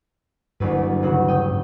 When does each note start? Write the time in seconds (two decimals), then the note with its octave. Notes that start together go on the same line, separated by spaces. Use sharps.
0.60 F#1 D2 G2 B4
1.02 D#1 C#3 F#4
1.28 D#5 G5